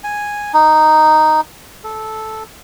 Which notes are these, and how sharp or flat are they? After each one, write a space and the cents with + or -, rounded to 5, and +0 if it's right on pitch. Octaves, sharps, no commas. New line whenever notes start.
G#5 -5
D#4 -5
A4 -10